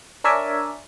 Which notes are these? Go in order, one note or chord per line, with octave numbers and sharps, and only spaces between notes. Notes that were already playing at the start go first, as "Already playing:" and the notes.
D4 A#4 C#5 D5 E5 G#5